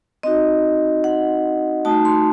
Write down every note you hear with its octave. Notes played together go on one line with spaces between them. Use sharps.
C4 D#4 F#4 D#5
F#5
A3 D#4 F#4 A5
C6